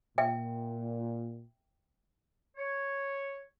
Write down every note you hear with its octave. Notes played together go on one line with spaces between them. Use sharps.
A#2 E5 G5
C#5